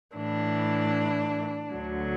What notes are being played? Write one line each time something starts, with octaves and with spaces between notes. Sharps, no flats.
A2 E3 D4
D2 D3 F#3